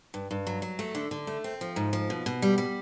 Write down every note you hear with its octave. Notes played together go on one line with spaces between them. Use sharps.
G2
G2
F#3
F#3
A3
D3
D3
A3
C4
F3
G#2
F3
B2
B2
G3
G3